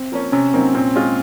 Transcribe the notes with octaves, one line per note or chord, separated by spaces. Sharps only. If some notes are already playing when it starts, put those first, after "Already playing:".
Already playing: C4
F3 A#3 C#4
C3 C#4
F#3 A#3 C4 D#4
A#2 C4
G#3 C#4 F4 G#4